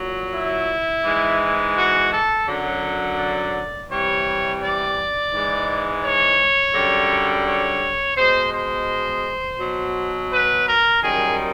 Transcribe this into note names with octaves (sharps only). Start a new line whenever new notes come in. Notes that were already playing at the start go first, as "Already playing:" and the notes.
Already playing: A#2 F#3
E4
G#2 E3 G#3
F#4
A4
F#2 D3 F#3
D5
C3 E3 G3 C#5
D5
G#2 E3 G#3
C#5
F#2 D3 G3
C#5
B2 G#3 C5
C5
B2 F#3
B4
A#4
F#2 D#3 G3 G#4